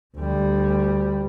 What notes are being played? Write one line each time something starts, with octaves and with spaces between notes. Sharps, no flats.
D2 G3